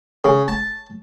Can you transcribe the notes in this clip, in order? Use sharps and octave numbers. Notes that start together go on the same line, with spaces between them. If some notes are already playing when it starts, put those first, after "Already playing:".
C#3
A5